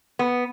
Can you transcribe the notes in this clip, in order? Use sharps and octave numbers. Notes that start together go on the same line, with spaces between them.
B3